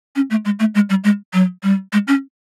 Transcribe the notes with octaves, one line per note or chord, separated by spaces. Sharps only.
C#4
A3
G#3
A3
G#3
G3
G#3
F#3
G3
G#3
C#4